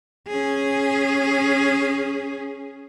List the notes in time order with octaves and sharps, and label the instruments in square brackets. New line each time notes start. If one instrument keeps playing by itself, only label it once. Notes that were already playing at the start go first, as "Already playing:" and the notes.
[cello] C#4 G#4